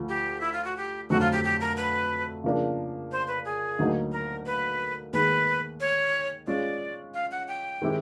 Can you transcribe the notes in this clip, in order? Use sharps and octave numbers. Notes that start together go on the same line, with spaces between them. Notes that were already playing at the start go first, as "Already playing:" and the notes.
Already playing: D2 D3 F3
G4
E4
F4
F#4
G4
F2 D3 F#3 A3 C4 F#4
F4
G4
G4
A#4
B4
C#3 F3 A#3 D4
C5
B4
G#4
D2 D3 F#3 A#3 D#4
A#4
B4
D#2 D#3 G#3 B4
C#5
G#3 C#4 F4 D5
F5
F#5
G5
D#3 G#3 C4 E4 G4